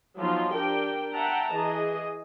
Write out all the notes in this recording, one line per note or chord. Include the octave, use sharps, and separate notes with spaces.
F3 F#3 B3 D#4 F4
D4 G4 A#4 G5
E5 F#5 G5 A5 A#5
E3 G#4 D#5